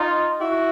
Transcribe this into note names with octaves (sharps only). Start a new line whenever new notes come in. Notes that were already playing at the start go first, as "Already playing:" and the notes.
Already playing: D#4 F4
E4 F#4